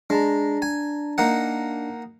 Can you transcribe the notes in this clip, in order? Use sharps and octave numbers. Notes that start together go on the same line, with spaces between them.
G#3 D4 A5 A#5
G#5
A#3 D#4 F#5